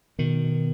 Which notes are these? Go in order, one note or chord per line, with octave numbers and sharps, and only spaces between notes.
B2 D#3